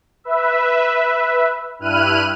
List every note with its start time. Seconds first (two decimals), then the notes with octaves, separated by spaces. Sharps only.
0.24 B4 E5
1.79 G2 E4 F6 F#6 D#7